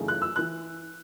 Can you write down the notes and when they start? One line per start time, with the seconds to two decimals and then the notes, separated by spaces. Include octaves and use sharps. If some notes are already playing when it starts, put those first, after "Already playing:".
Already playing: F#2 C#3 E3 A3 D#4
0.08 F#6
0.22 E6
0.36 E3 F#6